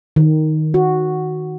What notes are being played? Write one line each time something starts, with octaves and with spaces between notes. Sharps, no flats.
D#3
F#4